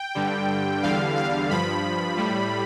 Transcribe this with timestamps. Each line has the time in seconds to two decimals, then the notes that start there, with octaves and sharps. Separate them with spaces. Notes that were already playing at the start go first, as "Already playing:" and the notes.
Already playing: G5
0.15 G2 D3 G3
0.83 E2 D3 G3 F5
1.16 F5
1.50 G2 F3 B5
2.17 A2 G3